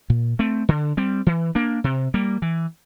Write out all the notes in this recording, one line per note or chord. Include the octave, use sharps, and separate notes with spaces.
A#2
A3 C4
D3
G3 C4
E3
A#3 D4
C3
G3 A#3
E3